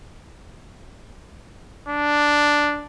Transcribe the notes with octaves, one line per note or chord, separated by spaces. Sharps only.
D4